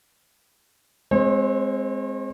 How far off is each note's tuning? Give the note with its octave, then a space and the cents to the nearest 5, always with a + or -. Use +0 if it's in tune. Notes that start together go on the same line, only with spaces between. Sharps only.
G#3 +0 C4 +0 C#5 -45